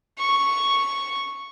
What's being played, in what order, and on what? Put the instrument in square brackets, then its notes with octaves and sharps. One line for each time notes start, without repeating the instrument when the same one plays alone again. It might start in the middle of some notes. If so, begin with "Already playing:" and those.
[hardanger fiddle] C#6